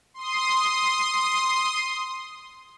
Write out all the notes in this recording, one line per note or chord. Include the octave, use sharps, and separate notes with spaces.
C6 D#6